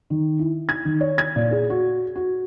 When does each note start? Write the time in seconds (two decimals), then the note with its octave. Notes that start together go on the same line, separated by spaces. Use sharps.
0.10 D#3
0.39 E4
0.69 G#6
0.85 D#3
1.01 C#5
1.18 G#6
1.36 A#2
1.51 G#4
1.70 F#4
2.15 F#4